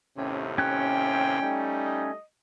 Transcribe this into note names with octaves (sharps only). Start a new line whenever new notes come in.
D#2 A2 C3 C#4
C#4 G5 F#6
G3 A3 D#4
D#5